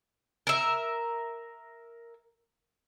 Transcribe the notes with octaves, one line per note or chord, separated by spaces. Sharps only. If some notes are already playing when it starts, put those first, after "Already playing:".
A#4 E5